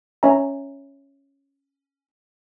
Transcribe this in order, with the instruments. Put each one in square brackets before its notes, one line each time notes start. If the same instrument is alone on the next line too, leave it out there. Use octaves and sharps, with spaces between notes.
[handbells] C#4 C#5 E5 G#5 A#5